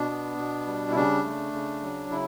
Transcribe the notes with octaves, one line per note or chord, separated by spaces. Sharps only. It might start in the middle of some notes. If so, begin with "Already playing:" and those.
Already playing: B2 D4
B3
B2
G3
E4
C#3 D4
A3
C#3
F#3
C#3 E4